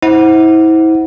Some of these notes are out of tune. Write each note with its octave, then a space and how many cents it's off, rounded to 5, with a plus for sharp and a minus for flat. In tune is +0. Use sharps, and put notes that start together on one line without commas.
E4 -35 C5 +0 F#5 +0